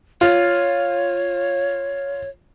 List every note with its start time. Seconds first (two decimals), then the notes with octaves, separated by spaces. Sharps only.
0.21 F4 C#5